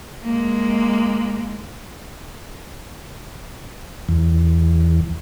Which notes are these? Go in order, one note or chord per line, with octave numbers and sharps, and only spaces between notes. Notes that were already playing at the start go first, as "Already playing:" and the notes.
G#3 A#3
E2